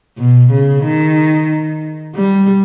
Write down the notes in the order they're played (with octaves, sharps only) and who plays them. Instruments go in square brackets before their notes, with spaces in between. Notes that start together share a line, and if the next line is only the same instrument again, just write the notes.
[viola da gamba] B2
C#3
D#3
G3